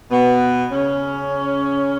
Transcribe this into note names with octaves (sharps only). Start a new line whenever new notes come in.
B2 B3
C#3 C#4